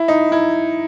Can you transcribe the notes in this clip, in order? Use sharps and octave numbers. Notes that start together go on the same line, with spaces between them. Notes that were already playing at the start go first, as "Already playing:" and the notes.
Already playing: E4
D#4
E4